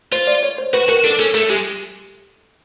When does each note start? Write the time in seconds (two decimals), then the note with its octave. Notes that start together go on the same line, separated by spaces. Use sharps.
0.12 F4 C5
0.27 D5
0.43 C#5
0.58 C5
0.73 F#4 B4
0.89 F#4 A#4
1.04 D4 A4
1.19 C#4 A4
1.35 A3 A4
1.50 G#3 G4